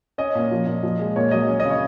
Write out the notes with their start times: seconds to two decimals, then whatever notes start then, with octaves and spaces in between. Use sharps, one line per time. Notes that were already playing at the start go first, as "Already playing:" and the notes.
0.18 C#4 D#5
0.35 A#2
0.51 F3
0.67 A#2
0.83 F3
0.99 G#3
1.16 A#2 C#5
1.31 F#3 D#5
1.48 C#4
1.60 D#5
1.65 C#3
1.70 C#5